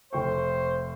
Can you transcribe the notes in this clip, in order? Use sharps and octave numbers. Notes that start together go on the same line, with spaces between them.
F1 C5 G5 C#6